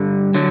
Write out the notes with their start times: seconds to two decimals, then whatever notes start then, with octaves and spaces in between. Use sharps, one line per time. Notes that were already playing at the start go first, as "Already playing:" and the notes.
Already playing: G2 D3 G3
0.35 D3 F#3